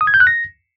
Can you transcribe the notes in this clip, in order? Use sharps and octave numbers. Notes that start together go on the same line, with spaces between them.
D#6
G#6
G6
F#6
A#6